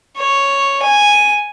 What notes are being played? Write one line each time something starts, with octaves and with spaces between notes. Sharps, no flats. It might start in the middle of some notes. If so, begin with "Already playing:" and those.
C#5
G#5